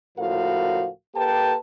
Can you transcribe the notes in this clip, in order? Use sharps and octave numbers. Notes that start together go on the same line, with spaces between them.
C#2 A2 F3 F#4 A#4 F5
A#3 G4 A4 B4 G5 A5